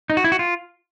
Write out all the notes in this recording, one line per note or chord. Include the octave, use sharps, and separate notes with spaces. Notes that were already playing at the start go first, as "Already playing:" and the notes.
D#4
F#4
E4
F#4
F4